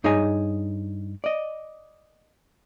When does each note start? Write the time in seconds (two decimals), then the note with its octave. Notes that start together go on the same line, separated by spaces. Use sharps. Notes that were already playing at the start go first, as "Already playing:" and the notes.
0.04 G2 D#4 G#4 C#5 D#5 G#5
1.24 D5 D#5